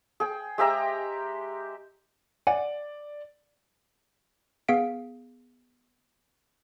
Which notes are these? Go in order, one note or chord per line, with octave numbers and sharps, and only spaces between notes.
G#4 G5
G#3 G4 E5 A#5
D5 F#5 G#5
B3 G#4 F5 B6 D7